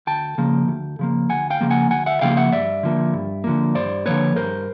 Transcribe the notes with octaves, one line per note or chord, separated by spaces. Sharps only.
D2 G5 A5
C#3 F3 A#3
D2
C#3 F3 A#3
D2 F#5 G#5
F5 G5
C#3 F3 A#3
F#5 G#5
D2 F#5 G#5
E5 F#5
C#3 F3 A#3 F5 G5
E5 F#5
G2 D5 E5
D3 F3 A#3
G2
D3 F3 A#3
G2 C5 D5
D3 F3 A#3 B4 C#5
G2 A#4 C5